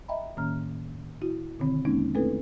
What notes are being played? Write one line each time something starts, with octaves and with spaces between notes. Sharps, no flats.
D#5 E5 G5 A#5 B5
A2 D#3 A#3 C#4 A#5 F6
E4 F#4
B2 D3 D#3 C4
E2 G#3 A#3 B3 C#4 D#4
A3 C4 D4 E4 A4 B4